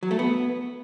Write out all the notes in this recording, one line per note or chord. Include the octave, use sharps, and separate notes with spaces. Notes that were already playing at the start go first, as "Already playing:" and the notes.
F#3
A3
B3